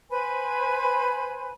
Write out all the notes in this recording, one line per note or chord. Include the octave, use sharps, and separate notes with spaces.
B4 C5 G#5 B5